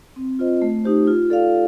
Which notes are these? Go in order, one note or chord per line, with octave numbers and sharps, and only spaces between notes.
C4
F4 C5 D#5
A3
D#4 G4 C5
F4
A4 D5 F5